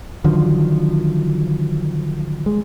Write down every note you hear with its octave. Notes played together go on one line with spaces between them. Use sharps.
D3 D#3 F3 F#3
G#3